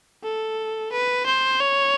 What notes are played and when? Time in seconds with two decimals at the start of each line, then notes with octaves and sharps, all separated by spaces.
0.24 A4
0.92 B4
1.26 C5
1.60 C#5